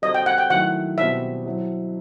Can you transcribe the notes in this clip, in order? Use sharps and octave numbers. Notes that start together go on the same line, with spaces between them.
G3 C4 F#4 A4 D#5
G5
F#5
G5
D#3 F#3 A3 E4 F#5
B2 G3 C4 F#4 E5
F#3 C4 E4